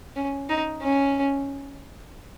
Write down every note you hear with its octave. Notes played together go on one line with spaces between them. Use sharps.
C#4
D#4
C#4